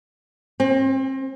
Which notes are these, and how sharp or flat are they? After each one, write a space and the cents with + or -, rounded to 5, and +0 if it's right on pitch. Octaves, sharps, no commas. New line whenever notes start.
C4 +35